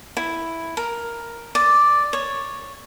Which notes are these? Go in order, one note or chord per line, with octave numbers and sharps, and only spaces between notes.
E4
A#4
D5
C#5